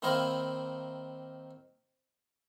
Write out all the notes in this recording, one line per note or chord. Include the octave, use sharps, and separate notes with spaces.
D#3 A#3 C4 E4 D#5 F5